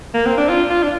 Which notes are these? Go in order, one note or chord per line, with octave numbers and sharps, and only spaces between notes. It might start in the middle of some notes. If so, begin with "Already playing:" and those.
A#3
C4
D4
F4
F4
D4